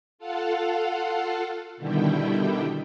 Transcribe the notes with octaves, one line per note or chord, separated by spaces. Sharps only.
F4 A4 F5 F#5
B2 D3 D#3 G3 E4 G5